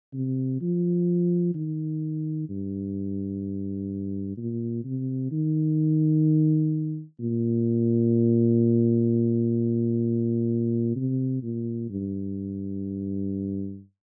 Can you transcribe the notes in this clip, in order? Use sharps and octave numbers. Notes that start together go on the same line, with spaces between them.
C3
F3
D#3
G2
A#2
C3
D#3
A#2
C3
A#2
G2